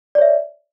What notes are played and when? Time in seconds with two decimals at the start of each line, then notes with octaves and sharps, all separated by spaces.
0.15 D5
0.18 C#5
0.22 E5